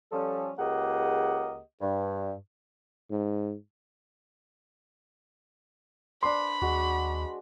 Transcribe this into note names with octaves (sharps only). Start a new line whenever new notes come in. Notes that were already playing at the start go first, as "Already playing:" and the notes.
F3 G3 C#4 A4
C#2 A#3 G4 G#4 D#5 F#5
G2
G#2
D4 B4 C5 B5 C6
D#2 G#3 F#4